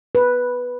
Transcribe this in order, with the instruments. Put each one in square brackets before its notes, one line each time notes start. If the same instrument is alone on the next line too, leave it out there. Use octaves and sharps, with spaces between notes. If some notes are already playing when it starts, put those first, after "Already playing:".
[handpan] B4